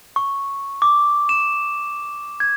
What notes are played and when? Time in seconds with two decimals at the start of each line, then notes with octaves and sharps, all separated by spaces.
0.16 C#6
0.82 D6
1.29 E7
2.40 G#6